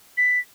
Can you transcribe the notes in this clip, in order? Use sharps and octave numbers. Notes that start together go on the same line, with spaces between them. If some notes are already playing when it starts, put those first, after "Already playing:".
B6